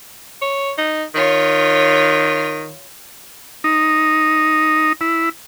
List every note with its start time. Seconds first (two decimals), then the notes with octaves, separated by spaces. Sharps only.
0.42 C#5
0.78 D#4
1.15 D#3 F4 C#5
3.64 D#4
5.01 E4